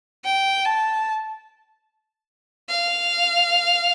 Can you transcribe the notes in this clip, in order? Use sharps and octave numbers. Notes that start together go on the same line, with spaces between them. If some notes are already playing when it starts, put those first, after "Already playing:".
G5
A5
F5